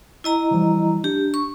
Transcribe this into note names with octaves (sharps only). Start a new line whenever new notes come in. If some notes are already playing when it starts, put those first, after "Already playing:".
E4 D#5 A#5
E3 F3 G3
D4 G4
C#6